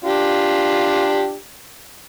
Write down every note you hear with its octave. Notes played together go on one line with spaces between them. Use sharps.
D4 F4 G4